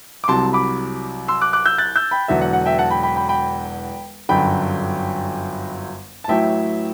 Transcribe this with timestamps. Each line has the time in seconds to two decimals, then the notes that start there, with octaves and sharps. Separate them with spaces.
0.24 D6
0.28 C2 C3 F#3 A5 C6
0.53 B5 D6
1.28 C6 E6
1.41 D6 F#6
1.53 D6 F#6
1.66 E6 G6
1.78 F#6 A6
1.96 E6 G6
2.11 G5 B5
2.28 E1 E2 D3 F#3 E5
2.41 F#5
2.53 F#5
2.66 E5 G5
2.79 F#5 A5
2.91 G5 B5
3.03 G5 B5
3.16 G5 B5
3.29 G5 B5
4.29 G1 F#2 D3 F#3 G5 B5
6.24 A5
6.28 A1 A2 F#3 E5 G5